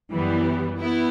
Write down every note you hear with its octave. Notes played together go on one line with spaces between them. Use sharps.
F#2 E3 G3 B3
B3 E4